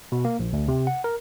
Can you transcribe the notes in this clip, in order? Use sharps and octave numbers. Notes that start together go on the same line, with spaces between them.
B2
A#3
A#1
D2
C3
F#5
A#4